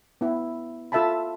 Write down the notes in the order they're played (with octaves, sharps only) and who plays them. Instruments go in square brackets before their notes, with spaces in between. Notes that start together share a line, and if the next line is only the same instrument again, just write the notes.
[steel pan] B3 E4
F4 A4 E5 F5 A5 B5